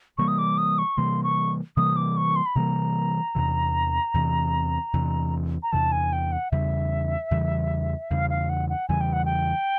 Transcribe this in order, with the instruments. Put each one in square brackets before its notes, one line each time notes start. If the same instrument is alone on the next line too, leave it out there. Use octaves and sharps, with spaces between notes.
[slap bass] C3 E3 G3 A#3 [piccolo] C#6
[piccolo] D#6
D6
D#6
C#6
[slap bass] C3 E3 G3 A#3 [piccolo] C6
[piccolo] C#6
[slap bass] C3 E3 G3 A#3 [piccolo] D#6
[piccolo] D6
C#6
C6
B5
[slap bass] C3 E3 G3 A#3 [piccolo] A#5
[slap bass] E2 C3 E3
E2 C3 E3
E2 C3 E3
[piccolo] A#5
[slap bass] E2 C3 E3 [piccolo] A5
[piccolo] G#5
G5
F#5
[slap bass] E2 C#3 E3 G3 [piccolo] E5
[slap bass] E2 C#3 E3 G3
[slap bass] E2 C#3 E3 G3 [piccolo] F5
[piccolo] F5
F#5
F#5
[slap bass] E2 C#3 E3 G3 [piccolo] G#5
[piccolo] G5
F#5
G5